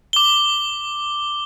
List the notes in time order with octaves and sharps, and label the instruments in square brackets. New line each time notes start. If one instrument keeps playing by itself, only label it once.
[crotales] D6 G7